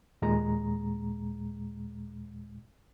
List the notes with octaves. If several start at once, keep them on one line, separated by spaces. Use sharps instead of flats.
D#2 A#2 G#3 A#5